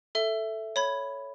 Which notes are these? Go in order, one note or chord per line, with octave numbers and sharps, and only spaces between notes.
A4 E5
C#5 B5 G#6